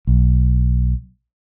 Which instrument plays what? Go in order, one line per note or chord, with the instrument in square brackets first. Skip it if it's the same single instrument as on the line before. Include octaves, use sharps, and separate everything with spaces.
[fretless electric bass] B1